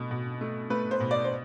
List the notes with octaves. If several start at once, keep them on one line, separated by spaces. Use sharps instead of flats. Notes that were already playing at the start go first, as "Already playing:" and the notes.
Already playing: B2 A3
B2
A3
A3 B4
C5
B2
D5
C5